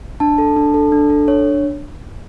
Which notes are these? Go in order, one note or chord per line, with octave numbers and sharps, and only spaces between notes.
D4 A5
A4
D4
A4
D4
A4
D4 C#5